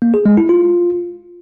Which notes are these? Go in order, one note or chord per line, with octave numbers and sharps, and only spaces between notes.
A#3
G#4
G#3
E4
F4